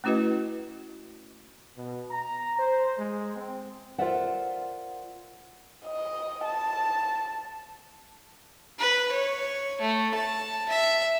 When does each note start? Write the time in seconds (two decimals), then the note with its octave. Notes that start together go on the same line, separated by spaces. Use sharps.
0.04 A3 C#4 E4 F#4 B4 D#5
1.77 B2
2.10 A#5
2.59 C5
2.97 G#3
3.35 C4
3.98 F4 A#4 C5 D5 E5 F#5
5.86 D#5
6.45 A5
8.79 B4
9.12 C#5
9.81 A3
10.15 A5
10.69 E5